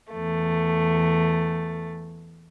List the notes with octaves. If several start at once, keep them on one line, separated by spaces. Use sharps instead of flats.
E2 A3